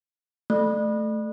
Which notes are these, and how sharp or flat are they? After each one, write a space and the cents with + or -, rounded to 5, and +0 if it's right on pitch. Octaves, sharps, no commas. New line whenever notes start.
A3 -5